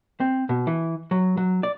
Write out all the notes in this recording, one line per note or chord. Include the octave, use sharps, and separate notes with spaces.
C4
B2
E3
F#3
F#3
D5